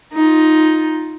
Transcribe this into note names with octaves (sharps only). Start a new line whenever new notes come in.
D#4 F4